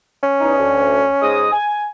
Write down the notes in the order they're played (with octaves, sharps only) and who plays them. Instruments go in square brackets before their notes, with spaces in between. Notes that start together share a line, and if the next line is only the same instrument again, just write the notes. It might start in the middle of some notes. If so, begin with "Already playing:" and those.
[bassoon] C#4
[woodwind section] E2 D#4
D2
G#2 G#3 D#6
G#5